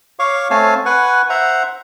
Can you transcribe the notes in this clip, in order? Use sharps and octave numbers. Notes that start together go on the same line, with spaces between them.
C#5 F5 C#6 D6
A3 C4 C#5 F5 G#5 A5
B4 F#5 G#5 C#6
C5 E5 F#5 A#5